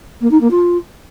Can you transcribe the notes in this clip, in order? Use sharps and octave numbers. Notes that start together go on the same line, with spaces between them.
A#3
D#4
A#3
F4